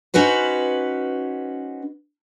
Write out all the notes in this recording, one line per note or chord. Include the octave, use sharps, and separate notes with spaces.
C#4 D#4 F#4 B4 C5